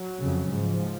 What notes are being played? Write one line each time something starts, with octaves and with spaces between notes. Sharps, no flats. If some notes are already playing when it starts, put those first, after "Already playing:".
Already playing: F#3
F2 C#3
G#2 F3